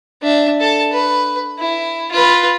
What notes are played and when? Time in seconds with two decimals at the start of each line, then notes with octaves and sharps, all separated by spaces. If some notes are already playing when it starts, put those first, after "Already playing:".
0.22 D4 E5
0.60 A4 A5
0.93 B4
1.59 E4
2.11 F4 B4